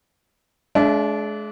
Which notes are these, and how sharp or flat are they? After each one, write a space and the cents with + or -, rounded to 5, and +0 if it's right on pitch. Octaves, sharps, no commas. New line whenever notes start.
G#3 +35 D4 -25 E5 +30